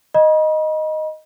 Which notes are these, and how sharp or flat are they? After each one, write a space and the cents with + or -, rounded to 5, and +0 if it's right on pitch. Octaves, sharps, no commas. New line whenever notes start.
D#5 +0 B5 -40